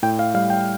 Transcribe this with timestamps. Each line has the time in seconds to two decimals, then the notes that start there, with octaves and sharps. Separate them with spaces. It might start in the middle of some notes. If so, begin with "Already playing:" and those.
0.03 A2 G5
0.19 F5
0.34 G3 F5
0.50 G5